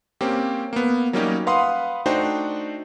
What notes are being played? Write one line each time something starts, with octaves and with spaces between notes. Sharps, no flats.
A#3 C4 C#4 G4
A#3 B3
F#3 G3 A#3 C#4 D#4 G4
B4 F5 F#5 B5 C6 D#6
A3 D4 D#4 F#4 C5 G5